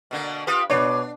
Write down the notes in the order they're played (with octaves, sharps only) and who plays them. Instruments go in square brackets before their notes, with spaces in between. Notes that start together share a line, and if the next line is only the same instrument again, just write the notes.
[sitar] B2 D3 A#3
[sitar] F4 G4 B4 [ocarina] D#6
[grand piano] B2 B4 C#5 [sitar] D4 [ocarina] D6